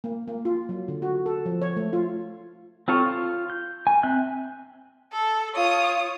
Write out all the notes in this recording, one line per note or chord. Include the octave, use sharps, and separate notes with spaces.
A#3
A#3
F4
F#3
D3
F#4
A4
F3
C#5
A3
F4
C4 F4 A4 C#5
F4
G6
G#5
C4 E5 F#6 G6
A4
F4 C#5 D#6